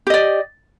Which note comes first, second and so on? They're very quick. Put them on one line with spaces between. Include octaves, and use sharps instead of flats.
G4 D#5 D5